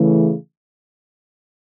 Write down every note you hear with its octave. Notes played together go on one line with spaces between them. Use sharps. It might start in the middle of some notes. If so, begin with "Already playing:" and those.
Already playing: C#3 E3 A3